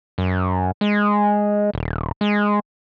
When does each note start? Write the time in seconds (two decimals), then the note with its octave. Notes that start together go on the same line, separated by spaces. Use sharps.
0.18 F#2
0.81 G#3
1.73 D#1
2.21 G#3